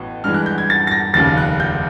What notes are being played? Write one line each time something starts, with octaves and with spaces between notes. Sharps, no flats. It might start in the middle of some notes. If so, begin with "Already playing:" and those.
Already playing: A1 A2 F#3 B3
G2 E3 G#3 F6
F#6
G6
G#6
A6
A6
A#6
F1 D#2 C#3 A6
F#6
G6